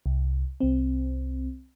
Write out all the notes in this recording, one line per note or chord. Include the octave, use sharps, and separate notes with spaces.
C2
C2 C4